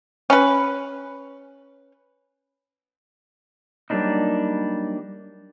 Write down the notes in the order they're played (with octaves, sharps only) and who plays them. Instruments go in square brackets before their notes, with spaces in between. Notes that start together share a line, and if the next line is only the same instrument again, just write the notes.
[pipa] C#4 B4
[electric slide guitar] F#3 G3 A#3 D4 D#4